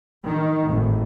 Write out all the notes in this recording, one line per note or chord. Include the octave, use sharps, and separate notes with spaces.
D#3
G#1 A2